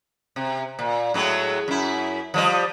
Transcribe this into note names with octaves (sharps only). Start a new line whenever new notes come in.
C3
A#2
A2 F#3 G#3
F#2 E4
F3 G3 D#5